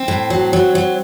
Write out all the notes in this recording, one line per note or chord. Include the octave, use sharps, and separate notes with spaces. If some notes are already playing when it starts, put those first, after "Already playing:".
Already playing: C4
A2
F#3
F#3
F#3